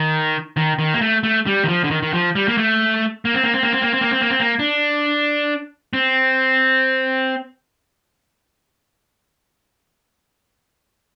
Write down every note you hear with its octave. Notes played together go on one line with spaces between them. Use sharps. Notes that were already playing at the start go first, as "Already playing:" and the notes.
Already playing: D#3
D#3
D#3
A#3
A3
A3
G3
D#3
F3
D3
D#3
D#3
F3
G3
A#3
A3
A#3
C4
A#3
C4
A#3
C4
A#3
C4
A#3
C4
A#3
C4
A#3
D4
C4